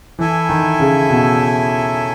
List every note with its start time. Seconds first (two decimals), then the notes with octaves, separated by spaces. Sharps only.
0.19 E3 E4 A4 E5 G#5
0.49 D#3
0.80 C#3
1.10 B2